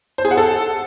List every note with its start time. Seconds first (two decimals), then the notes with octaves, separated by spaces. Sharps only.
0.18 C5
0.25 G#4
0.31 F#5
0.37 A4